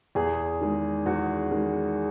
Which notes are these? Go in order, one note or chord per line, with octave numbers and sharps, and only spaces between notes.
E2 G#4
D#3 G#3
E2 F#4
D#3 G#3